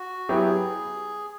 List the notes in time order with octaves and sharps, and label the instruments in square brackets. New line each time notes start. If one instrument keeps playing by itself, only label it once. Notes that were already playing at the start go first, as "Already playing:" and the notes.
Already playing: [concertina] F#4
[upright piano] F#3 B3 E4 G4 [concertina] G#4